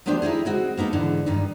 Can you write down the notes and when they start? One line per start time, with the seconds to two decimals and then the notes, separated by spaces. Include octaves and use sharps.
0.06 F3 A3 B3 D4 G4 C5
0.22 D#4 E4 G4 G#4
0.45 G#3 C4 F#4
0.77 A#3 B3 D#4 A4
0.93 G#2 D3 E3
1.26 G2 D#3 D#4